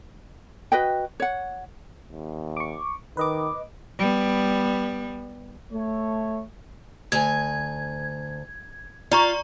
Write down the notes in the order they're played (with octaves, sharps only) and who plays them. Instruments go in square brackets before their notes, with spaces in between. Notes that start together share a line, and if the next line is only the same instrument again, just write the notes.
[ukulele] F#4 B4 D#5 G5
C#5 F#5
[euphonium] D#2
[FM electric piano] C#6 D6
[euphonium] D#3 [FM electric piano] B4 D#5 D6
[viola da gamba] G3 B3
[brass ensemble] A3 C#5
[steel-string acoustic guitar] D2 G#5 [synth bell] G#6
[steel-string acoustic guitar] F4 [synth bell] D5 A#5 C#6